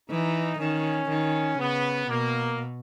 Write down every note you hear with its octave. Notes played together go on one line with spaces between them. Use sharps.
E3 D#4
D#3 C#4
D#3
C#3 B3
B2 A#3